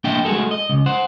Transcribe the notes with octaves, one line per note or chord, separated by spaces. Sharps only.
A#3 D4 D#5 E5 G5
G#3 A3 F#4 G#4 A4
D#5
C#2
C5 F#5